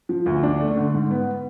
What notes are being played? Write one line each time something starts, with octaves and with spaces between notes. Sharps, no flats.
F3
D2
D4
A3
D3
G#2
B3